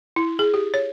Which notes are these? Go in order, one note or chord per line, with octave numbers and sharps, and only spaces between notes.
E4
G#4
G4
C#5